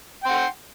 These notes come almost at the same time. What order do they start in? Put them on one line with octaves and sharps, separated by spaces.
G5 C6 F#5